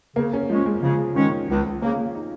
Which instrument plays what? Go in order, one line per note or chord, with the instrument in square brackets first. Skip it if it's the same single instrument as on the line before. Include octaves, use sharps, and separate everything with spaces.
[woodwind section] C#3 [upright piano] A#3
[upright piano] C#4
[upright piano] F3 [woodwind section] G#3 C#4
[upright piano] G#3
[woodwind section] C#3 [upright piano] F3
[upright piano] D#3 [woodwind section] G#3 C#4
[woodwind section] C#2 [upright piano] F3
[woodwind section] C#3 A#3 [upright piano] C#4
[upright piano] D#4